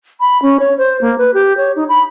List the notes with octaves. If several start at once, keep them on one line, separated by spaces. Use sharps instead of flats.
B5
C#4
C#5
C5
A#3
B4
G4
C#5
D#4
B5